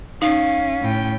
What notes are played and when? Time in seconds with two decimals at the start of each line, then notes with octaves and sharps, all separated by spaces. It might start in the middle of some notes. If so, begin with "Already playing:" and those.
0.22 C#4 D#4 F5
0.80 A2 G5